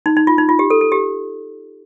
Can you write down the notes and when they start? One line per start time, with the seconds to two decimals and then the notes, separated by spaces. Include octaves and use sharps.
0.06 D#4
0.17 D#4
0.27 F4
0.38 D#4
0.49 F4
0.59 G4
0.70 A4
0.81 A4
0.92 G4